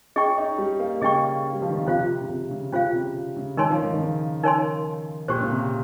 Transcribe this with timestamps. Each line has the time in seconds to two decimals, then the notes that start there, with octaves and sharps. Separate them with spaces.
0.16 C#4 G#4 D#5 G5 C#6
0.38 D#4
0.58 G3
0.80 A#3
1.01 C#3 G#4 D#5 G5 C#6
1.53 G3
1.62 F3
1.71 D#3
1.79 C#3
1.87 C3 C#4 F4 C5 F5
2.21 C#3
2.29 C3
2.51 C#3
2.73 C#3 C#4 F4 C5 F5
2.93 C3
3.37 C#3
3.57 D#3 D#4 A#4 C#5 G#5 C6
3.70 F3
3.82 D#3
3.93 D#3
4.00 C#3
4.43 D#4 A#4 C#5 G#5 C6
5.28 A#2 C#4 G4 C5
5.40 C#3
5.50 C3